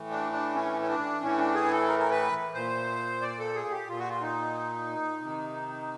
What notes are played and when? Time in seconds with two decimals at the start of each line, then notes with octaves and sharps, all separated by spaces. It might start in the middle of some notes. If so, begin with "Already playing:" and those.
Already playing: A2 E3
0.10 D4
0.32 D4
0.55 C#4
0.82 C#4
0.88 D4
1.22 A2 E3 C#4
1.38 D4
1.54 G#4
1.71 A4
1.88 A#4
1.99 A#4
2.11 B4
2.54 A#2 C5
3.22 D5
3.39 A4
3.55 G#4
3.71 G4
3.88 A#2 F4
3.99 F#4
4.09 F4
4.21 D#4
5.21 C3 D#3